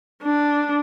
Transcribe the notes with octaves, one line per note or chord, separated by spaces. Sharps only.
D4